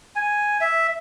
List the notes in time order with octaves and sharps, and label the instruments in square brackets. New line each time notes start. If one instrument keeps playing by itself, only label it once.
[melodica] G#5
E5